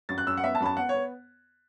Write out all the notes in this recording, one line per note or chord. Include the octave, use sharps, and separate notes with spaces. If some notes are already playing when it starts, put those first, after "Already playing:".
F#2 A6
F#6
F#2 E6
F#5
B3 E5
A5
F#2 B5
A5
B3 F#5
C#5
B3